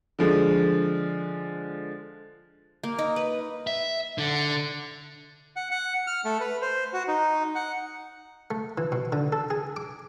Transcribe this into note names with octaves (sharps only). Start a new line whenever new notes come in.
D3 F3 G#3
A#3
D#4
B4
E5
D3
F#5
F#5
F6
A3
B4
C5
F#4
D#4
F#5
A3
E3
B2
D3
A4
G#4
D6